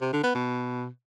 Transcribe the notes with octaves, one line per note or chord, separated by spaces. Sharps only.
C3
D3
B3
B2